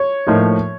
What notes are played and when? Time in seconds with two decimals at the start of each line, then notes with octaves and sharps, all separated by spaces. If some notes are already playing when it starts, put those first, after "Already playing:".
Already playing: C#5
0.27 A2 F3 A#3 D#4